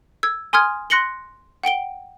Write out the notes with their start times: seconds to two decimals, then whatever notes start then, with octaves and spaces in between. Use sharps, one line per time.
0.23 E6 G#6
0.53 G#5 C6 D#6 F6 G#6
0.90 C6 F#6 A#6 C#7 F#7 G7
1.63 F#5 G5 D7 G7